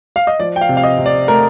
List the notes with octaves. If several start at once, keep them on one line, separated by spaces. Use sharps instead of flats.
F5
D#5
F3 D5
G5
F5
C3
F5
D#5
C3
D5
A3 A#4